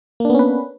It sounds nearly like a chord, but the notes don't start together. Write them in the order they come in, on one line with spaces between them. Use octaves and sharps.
A#3 D4 B3 C#4 B4